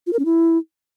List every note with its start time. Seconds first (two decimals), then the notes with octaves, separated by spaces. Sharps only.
0.07 F4
0.13 A#4
0.19 C#4
0.25 E4